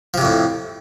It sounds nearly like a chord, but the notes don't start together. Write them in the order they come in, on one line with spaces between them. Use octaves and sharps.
F3 C3 F2 A2